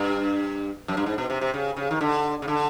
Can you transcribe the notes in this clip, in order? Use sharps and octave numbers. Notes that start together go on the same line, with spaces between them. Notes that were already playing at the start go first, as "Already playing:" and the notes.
Already playing: G2
F#2
G2
G#2
B2
C3
C3
C#3
C#3
D#3
D3
C#3
D3